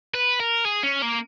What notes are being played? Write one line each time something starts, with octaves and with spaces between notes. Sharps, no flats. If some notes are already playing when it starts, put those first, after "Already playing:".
B4
A#4
G#4
C#4
A#3